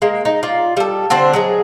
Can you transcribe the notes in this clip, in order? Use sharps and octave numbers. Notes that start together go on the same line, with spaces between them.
G#3 A#3
D#4
F4 D5
G3 A4
D3 C4 D4 C5
F#3 G#3 G#4